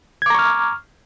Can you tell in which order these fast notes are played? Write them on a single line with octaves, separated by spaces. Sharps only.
G#6 D6 A#5 C#6 F6